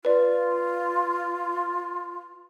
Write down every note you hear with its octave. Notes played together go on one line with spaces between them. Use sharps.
F4 B4 D5